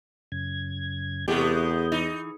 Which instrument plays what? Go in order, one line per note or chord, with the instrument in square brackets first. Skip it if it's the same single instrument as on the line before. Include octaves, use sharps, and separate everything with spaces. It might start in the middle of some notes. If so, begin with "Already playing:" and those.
[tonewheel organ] F#2 C#3 G#6
[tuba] E2 [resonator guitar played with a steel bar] C3 G4 [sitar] G#3 A3 B3 [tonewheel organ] G6
[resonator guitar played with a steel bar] E3 [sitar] D#4